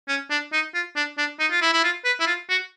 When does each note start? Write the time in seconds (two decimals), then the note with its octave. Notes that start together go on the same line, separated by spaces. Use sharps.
0.08 C#4
0.30 D4
0.53 D#4
0.74 F4
0.96 D4
1.18 D4
1.39 D#4
1.51 F4
1.62 E4
1.73 E4
1.84 F4
2.05 B4
2.20 E4
2.27 F4
2.49 F#4